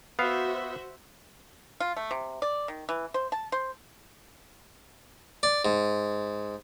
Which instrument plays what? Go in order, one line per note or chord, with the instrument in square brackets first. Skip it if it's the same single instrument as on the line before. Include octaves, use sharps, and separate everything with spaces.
[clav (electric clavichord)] B3 F5 [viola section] F#4 C5 E5
[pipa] F4
A3
C3
D5
D#3
E3
C5
A5
C5
[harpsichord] D5
G#2